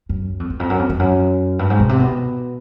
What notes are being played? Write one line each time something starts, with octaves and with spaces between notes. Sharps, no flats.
F#2
F2
E2
F2
F#2
F2
F2
F#2
G2
G#2
B2
C3
B2